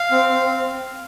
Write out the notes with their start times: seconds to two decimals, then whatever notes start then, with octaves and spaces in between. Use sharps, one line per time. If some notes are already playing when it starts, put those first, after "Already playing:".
Already playing: F5
0.11 C4
0.29 C4
0.47 C4